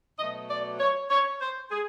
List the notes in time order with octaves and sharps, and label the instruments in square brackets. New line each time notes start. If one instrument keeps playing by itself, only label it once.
[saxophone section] B2 F#3 A3 D#5
D5
C#5
C#5
C5
G#4